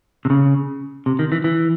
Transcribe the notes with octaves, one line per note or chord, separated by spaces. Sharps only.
C3
C#3
C3
D#3
E3
E3